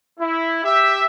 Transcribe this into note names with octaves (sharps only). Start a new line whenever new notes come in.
E4
G4 E5